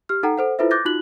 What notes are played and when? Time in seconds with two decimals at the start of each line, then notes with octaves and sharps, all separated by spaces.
0.09 G4 F6
0.23 D#4 A4 F#5 G5 A#5
0.38 A4 C5 F#5
0.59 E4 F4 A4 B4 C5 E5
0.71 D6 F#6 G6 A6 A#6
0.85 D#4 F4 F#4 F#6 F#7